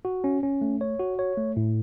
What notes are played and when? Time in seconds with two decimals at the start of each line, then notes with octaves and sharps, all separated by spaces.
0.05 F#4
0.24 C#4
0.43 C#4
0.61 A3
0.81 C#5
1.00 F#4
1.19 C#5
1.37 A3
1.57 A2